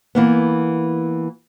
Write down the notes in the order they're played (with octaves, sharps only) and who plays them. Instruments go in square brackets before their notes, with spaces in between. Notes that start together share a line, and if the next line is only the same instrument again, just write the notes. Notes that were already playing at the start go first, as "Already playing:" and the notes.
[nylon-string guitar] E3 A#3 B3